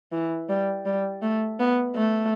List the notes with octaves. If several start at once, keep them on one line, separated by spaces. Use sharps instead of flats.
E3
G3
G3
A3
B3
A3